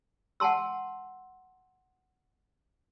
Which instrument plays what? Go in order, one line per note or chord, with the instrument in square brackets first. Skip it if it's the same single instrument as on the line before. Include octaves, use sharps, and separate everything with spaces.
[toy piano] F#5 G#5 A5 C6 E6